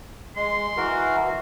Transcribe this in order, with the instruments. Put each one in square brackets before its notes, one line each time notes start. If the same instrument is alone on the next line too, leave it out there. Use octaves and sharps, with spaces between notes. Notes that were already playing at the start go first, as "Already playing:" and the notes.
[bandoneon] G#3 [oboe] C6
[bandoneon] E3 F#4 A#4